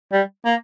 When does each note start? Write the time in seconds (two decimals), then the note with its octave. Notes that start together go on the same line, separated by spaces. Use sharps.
0.12 G3
0.45 A#3